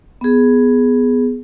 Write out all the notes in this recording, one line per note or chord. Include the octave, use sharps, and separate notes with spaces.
B3 G#4